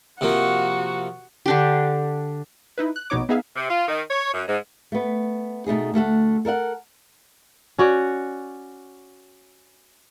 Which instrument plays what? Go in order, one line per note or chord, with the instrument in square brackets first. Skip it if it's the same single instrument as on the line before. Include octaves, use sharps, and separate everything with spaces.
[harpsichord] C3 F3 A#3 [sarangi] F#4
[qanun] D3 D4 G4
[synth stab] D#4 E4 B4
F#6
A#1 B2 B3 D#4 C#5 D6
B3 D#4 G#4 E5 F5
[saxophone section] C3
F4
D#3
C#5
F#2
G#2
[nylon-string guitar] A3 B3
B2 A3 D#4 G#4
D2 A3 A4 F#5
A4 A#4 E5 F#5
[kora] C#4 F#4 C#5 D5